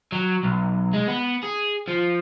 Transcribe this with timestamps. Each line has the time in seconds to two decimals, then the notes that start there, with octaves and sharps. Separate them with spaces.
0.12 F#3
0.44 B1
0.94 G#3
1.08 B3
1.43 G#4
1.88 F3